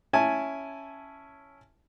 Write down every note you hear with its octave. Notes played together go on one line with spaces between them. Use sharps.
C#4 E4 G#5 A5